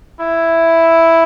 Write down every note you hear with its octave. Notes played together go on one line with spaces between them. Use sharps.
E4